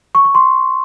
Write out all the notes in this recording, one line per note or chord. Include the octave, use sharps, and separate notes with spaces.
C#6
C#6
C6